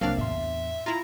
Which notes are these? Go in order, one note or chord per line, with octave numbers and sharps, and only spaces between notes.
C2 F#3 A#3 C4 D4 F5 A5
E2 A2 E5 C6
E4 F4 A#5